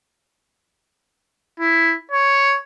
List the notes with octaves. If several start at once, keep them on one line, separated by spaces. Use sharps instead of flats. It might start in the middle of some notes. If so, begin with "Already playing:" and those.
E4
C#5